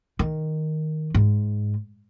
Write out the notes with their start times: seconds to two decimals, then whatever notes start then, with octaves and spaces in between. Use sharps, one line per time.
0.19 D#3
1.14 G#2